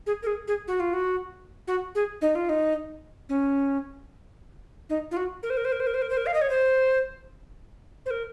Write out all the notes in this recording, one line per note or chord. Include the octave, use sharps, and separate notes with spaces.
G#4
A#4
G#4
G#4
F#4
F4
F#4
F#4
G#4
D#4
F4
D#4
C#4
D#4
F4
F#4
A#4
C5
A#4
C5
A#4
C5
A#4
C5
A#4
C5
A#4
F5
D#5
C#5
C5
C5
A#4